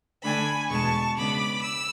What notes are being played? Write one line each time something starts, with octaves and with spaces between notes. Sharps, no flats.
D3 A3 D4 G#5 B5
E2 B2 G#3 A5 C#6
C#3 G#3 B3 D4 B5 D6
E6